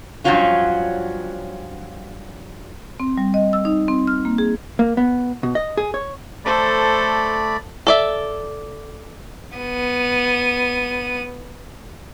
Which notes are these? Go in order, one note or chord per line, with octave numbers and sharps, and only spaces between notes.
G2 F3 F#3 C#4 F4 F#4
C4
G3
D#5
E6
D#4
C4
F6
A#3
G#4
A#3
B3
B2
D#5
G#4
C#5
A3 A4 C5 D5 B5
A4 D5 E5
B3 D#7